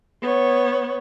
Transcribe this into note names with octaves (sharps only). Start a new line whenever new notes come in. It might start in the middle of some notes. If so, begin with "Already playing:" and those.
B3 C#5